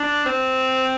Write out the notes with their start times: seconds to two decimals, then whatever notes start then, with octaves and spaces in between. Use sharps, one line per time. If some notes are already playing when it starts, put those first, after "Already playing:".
Already playing: D4
0.26 C4